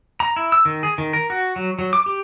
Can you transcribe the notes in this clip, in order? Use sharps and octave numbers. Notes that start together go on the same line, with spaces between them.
A#5
E4
E6
D#3
G#4
D#3
A#4
F#4
F#3
F#3
D6
G4